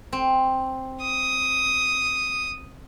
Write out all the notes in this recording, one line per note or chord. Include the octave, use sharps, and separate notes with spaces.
C4
D#6